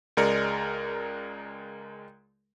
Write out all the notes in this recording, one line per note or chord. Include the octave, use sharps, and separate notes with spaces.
C#2 G#3 A#4 D5 C#7